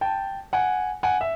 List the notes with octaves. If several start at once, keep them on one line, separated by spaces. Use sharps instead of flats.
G5 A5
F#5 G#5
F#5 G#5
E5